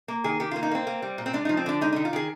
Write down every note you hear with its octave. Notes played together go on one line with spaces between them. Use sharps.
A#3
D#3 G#4
D#3 G4
A#3 F4
D#4
A#3 C4
A#3
G3
A#2
C4
G#3 D4
F3 D#4
C4
D3 D4
G#3 D#4
D#3 D#4
F4
D#3 G#4